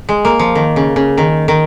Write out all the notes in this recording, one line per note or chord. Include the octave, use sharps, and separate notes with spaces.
G#3
A#3
F3
D#3
C#3
C#3
D#3
D#3